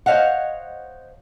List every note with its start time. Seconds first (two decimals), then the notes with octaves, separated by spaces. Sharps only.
0.06 C5 C#5 D#5 F5 F#5